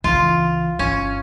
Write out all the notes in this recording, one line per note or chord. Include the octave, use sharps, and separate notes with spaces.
C#2 E3 F4
G1 C#4